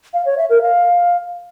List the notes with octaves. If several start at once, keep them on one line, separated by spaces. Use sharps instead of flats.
F5
C#5
E5
A#4
F5